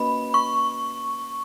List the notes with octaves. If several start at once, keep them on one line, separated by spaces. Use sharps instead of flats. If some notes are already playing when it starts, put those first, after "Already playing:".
Already playing: A#3 C#4 F#4 B4 D#5 B5
C#6